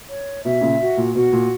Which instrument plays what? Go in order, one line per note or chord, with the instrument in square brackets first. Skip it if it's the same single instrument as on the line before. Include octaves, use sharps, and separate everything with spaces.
[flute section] C#5
[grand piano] B2 [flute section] E5
[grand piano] A#2 C#3
[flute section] F#4
[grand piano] A#2
[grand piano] B2 [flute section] F#4
[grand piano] A#2